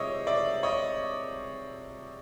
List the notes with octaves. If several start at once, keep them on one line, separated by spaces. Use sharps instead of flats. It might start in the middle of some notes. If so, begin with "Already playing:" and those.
Already playing: C3 F3 G#3 C#5 D#5 E5
D5 E5
C#5 D#5